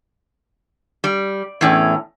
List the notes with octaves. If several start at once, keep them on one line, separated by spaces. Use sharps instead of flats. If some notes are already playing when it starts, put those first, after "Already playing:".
G3
E2 A2 C#4